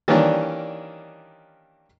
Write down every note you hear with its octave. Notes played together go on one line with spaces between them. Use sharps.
D#3 E3 G3 A#3 C#4 D4